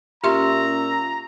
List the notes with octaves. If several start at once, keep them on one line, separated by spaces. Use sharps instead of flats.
A#2 C#4 G4 E5 A#5 C6 E6